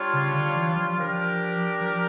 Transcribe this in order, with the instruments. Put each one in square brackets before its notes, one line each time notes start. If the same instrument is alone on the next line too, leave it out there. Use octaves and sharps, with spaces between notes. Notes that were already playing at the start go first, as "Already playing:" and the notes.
Already playing: [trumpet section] G3 D4 F4 C#5
[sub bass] C#3
D3
E3
F3
[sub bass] F3 [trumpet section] D4 G4 A#4
[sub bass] F3